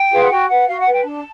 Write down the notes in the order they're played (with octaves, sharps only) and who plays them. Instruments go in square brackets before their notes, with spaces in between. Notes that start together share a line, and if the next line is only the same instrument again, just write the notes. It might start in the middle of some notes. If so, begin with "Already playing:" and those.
Already playing: [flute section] G5
F4 G#4 B4 F5
F#5
F#4 G5
B4 F#5
F#4 F5
F#5
B4
G5
D4 A5